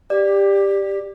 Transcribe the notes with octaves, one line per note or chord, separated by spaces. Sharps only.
G4 D5